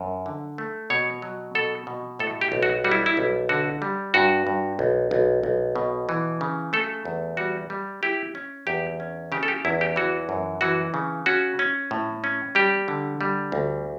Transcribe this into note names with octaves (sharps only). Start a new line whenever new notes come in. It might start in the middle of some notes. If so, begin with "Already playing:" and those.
Already playing: F#2
D3
A3
B2 C#5
F#3
B2 A4
B2
A2 A4
G4
B1
F#4
G3 F#4
E4
E4
B1
D3 F#4
G3
G2 F#4
G2
B1
B1
B1
B2
E3
C#3
A3 A4
E2
G3 F#4
G3
E4 G4
C#4
E2 G4
C#4
C#3 G4
A4
G4
E2 E4
G4
E3 F#4
F#2
E3 F#4
C#3
C#4 F#4
C#4
A2
C#4
G3 G4
D3
G3
D2